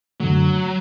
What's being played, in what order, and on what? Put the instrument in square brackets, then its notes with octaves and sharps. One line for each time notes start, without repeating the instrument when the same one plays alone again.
[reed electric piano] F#2 D3 A3 [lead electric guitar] F#3